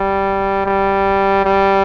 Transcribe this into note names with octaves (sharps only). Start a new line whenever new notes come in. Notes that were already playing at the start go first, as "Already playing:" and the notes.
Already playing: G3
G3
G3